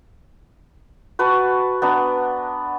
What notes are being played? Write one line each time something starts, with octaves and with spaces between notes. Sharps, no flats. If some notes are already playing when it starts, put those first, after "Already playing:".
F#4 B4 A5 C#6
B3 D4 A#5